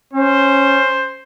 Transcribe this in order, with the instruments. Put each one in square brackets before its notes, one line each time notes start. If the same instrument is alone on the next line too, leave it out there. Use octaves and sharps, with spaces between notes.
[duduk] C#4 [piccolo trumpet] C5